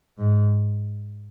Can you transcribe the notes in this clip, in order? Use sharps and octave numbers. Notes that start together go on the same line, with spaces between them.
G#2